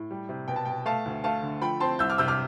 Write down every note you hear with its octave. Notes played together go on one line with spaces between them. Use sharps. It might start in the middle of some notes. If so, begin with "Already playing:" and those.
Already playing: A2
G3
C3
B2 G5
A5
B2 G5
A3 F5 A5
D2
A3 F5 A5
D3
F3 G5 B5
C4 A5 C6
C2 E6 G6
D6 F6
C3 E6 G6
D6 F6